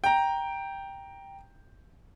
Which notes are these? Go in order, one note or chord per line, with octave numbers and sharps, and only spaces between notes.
G5 A#5